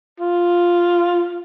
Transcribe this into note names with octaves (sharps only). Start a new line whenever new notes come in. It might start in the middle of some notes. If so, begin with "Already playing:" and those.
F4